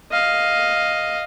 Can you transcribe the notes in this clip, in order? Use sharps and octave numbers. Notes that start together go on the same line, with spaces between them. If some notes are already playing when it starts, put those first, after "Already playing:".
D#5 F5